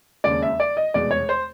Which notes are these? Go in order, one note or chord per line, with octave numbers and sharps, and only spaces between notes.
E1 D#2 C#3 D5
E5
D5
D#5
F1 E2 B2 G#3 D5
C#5
C5